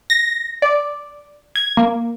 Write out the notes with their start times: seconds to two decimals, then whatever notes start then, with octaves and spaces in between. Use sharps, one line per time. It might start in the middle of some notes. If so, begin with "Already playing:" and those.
0.10 A#6
0.62 D5
1.56 G#6
1.77 A#3